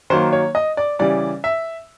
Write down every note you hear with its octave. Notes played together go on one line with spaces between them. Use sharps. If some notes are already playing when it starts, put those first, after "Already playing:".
D#3 F#3 A#3 C5
C#5
D#5
D5
C#3 E3 G3 D5
E5